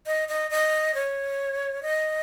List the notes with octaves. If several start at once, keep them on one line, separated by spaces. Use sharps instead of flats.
D#5
D#5
D#5
C#5
D#5